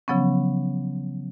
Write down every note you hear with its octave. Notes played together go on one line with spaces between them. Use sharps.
C#3 F3 F#3 B3 C#4